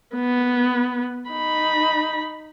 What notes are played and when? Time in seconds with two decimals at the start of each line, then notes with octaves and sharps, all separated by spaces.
0.15 B3
1.30 D#4 B5